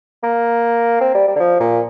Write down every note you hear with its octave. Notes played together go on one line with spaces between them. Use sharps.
A#3
C4
G3
G3
D3
F3
A#2